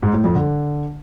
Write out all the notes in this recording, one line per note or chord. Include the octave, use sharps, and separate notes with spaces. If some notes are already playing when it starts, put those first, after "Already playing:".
G#2
A2
F2
D3